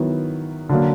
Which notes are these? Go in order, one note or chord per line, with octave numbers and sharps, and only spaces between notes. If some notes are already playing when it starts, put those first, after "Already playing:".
Already playing: D#3 F#3 B3 E4
D3 F#3 A#3